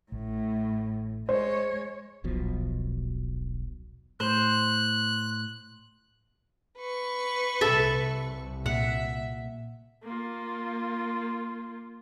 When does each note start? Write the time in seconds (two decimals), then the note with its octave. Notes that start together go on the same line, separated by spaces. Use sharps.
0.12 A1 A2
1.29 G#3 C5 C#5
2.24 D#1 B1 B2 F3
4.20 A2 C5 F#6
6.78 B4 C#6
7.61 C2 C3 A4 E5
8.66 A#2 E5 F#5
10.03 A#3 F4